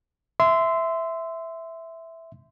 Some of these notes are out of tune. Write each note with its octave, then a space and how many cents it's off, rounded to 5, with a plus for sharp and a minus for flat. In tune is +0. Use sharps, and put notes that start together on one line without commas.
E5 +0 C6 -20